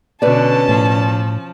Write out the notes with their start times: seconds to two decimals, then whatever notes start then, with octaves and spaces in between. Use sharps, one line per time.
0.22 B2 D3 C#4 B4 D5 A5
0.69 A2 F3